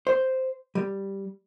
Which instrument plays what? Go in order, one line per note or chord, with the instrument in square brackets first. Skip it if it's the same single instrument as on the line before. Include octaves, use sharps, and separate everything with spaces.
[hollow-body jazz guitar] C5
G3